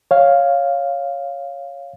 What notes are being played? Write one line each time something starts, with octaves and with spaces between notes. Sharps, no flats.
C#5 F5